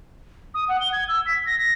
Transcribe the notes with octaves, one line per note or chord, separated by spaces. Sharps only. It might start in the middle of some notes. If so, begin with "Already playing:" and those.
D#6
F#5
G7
G#6
E6
B6
A#6
A#6